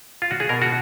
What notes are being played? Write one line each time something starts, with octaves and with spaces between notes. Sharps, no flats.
F4
F#4
G#4
B2 A#4
F#4